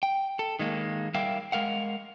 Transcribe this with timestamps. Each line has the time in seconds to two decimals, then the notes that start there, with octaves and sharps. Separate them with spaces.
0.03 G5
0.39 A4
0.59 D#3 G#3 A#3
1.14 G3 A#4 E5 F5 G5
1.52 G#3 A#4 F5 F#5